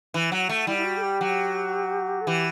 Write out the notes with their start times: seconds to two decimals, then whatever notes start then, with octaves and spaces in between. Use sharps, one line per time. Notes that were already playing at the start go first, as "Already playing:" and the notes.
0.14 E3
0.32 F#3
0.49 A3
0.66 G3 E4
0.77 E4
0.84 F#4
0.97 A4
1.02 G4
1.21 F#3
2.21 A4
2.27 E3 G4